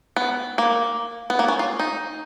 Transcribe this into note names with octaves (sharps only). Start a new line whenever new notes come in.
B3
A#3
B3
A#3
C#4
F4
D#4